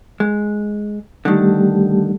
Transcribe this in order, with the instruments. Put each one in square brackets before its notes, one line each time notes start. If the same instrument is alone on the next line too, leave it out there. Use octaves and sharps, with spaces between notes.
[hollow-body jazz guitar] G#3
[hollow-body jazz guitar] D3 D#3 [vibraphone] G3 A3 G4